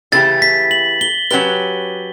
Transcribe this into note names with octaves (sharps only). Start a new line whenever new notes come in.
C#3 E3 A3 E4 G4 A6
B6
F#7
G7
F#3 C#4 G4 B4 G7